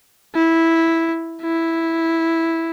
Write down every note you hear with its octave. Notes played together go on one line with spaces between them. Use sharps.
E4
E4